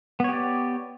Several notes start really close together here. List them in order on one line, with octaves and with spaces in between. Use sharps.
B3 C#5 G4 D5